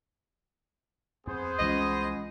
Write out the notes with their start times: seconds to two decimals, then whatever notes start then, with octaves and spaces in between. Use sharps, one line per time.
1.27 F2 B3 G#4 C5
1.59 C2 E3 G#3 C#4 F4 D#5